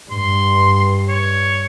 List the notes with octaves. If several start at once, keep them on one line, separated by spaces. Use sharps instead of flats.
G2 C6
C#5